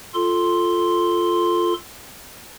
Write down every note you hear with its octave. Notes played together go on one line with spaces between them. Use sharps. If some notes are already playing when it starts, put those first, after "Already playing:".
F4 A4 C6